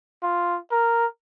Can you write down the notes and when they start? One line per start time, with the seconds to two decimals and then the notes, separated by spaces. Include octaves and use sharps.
0.23 F4
0.72 A#4